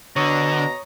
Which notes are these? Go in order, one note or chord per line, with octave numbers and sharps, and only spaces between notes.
B2 D3 C#5 A#5 C#6 D#6